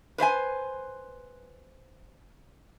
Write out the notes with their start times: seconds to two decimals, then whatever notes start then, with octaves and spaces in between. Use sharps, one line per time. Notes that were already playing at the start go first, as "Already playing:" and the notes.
0.18 B4 C5 E5 G#5